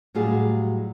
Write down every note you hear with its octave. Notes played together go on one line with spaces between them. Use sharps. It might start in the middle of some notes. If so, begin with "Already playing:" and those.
A2 F#3 G3 F4 G#4